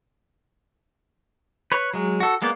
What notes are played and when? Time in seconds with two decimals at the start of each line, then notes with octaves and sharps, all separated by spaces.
1.72 B4 C#5
1.94 F#3 G#3
2.20 F#4 A4
2.42 G#3 A#3 B3 D5